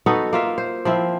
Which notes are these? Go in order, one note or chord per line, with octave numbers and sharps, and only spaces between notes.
B3 D#4 F#4 A4
A#3 F4 E5
C5
F3 C4 E4